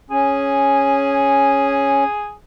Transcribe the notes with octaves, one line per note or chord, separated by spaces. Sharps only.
C#4 G#4